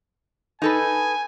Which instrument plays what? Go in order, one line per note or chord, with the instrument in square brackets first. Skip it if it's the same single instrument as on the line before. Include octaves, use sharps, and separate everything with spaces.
[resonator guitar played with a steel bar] D#4 A4 B4 [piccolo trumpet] G#5